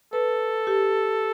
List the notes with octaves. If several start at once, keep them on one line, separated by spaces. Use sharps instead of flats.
A4 B4
G4